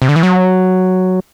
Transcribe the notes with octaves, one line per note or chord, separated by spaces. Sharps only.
C3
D3
E3
F#3